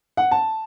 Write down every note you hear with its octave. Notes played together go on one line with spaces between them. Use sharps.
F#5
A5